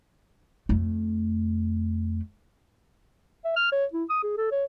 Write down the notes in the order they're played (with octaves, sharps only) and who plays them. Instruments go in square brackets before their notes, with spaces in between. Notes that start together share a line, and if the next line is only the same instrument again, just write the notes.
[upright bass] F2 A3
[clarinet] E5
F6
C#5
E4
D#6
G#4
A4
C#5